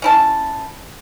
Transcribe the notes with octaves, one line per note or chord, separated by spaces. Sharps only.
C#4 E4 A5